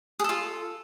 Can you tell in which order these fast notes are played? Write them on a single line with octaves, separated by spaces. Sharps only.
G#4 A4 F4